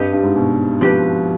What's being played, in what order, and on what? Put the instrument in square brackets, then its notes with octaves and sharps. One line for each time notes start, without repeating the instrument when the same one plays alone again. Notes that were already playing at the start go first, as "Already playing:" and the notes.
Already playing: [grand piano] G2 [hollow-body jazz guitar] C4 G4 B4 D#5
[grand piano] G2
G#2
B2
[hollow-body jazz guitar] F3 C4 G4 B4